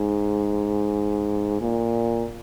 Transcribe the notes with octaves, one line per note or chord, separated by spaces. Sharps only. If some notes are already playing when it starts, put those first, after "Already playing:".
Already playing: G#2
A#2